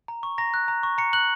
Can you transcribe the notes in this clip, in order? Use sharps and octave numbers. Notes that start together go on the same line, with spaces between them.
A#5
C#6
A#5 A#6
F#6
A#5
C#6
A#5 C#7
F#6 F#7